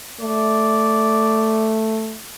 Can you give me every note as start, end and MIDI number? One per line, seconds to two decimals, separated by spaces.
0.21 2.16 57
0.21 1.72 74